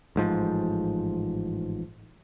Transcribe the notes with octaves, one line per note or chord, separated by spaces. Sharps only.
A1 G#2 F3